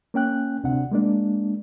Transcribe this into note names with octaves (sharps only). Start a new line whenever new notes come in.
A#3 C#4 G5 F#6
D2 C3 C4 D4 F#5
G#3 A#3 D4